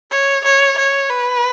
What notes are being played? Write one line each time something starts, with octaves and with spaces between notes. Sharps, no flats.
C#5
C#5
C#5
B4